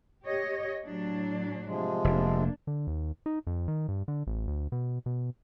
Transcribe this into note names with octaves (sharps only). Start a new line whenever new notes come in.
G4 C#5 D#5
A2 F#3 D4
C3 F3 G#3
F1 A#3 D4
D3
D#2
D#4
F2
D#3
G2
D3
A1
D2
B2
B2